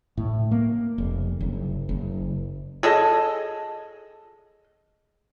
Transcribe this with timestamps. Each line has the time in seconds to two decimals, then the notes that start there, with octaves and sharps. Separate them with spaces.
0.17 A2
0.51 A#3
0.98 F1
1.41 F#1
1.89 F#1
2.83 G#4 A4 D#5